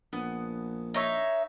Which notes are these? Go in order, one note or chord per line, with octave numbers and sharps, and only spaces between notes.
A#1 B3
D#4 C#5 E5